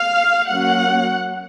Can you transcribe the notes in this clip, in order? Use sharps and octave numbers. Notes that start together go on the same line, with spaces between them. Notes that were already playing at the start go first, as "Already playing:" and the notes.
Already playing: F5
F#3 A#3 C#4 F#5